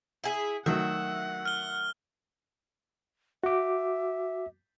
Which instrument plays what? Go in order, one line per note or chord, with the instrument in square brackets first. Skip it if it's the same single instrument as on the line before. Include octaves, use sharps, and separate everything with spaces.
[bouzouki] E4 G#4
[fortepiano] D#3 F#3 A3 [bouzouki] E5 [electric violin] F#5
[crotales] F6 G7
[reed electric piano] F#4 D6 [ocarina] E5